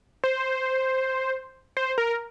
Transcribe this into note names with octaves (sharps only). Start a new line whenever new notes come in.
C5
C5
A#4